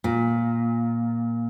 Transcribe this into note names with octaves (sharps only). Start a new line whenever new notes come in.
A#2